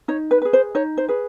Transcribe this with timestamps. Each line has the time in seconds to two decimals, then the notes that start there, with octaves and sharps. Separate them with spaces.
0.08 D#4 C#5
0.31 B4
0.42 G#4 B4
0.53 C5
0.75 D#4 C#5
0.97 C5
1.09 G#4 B4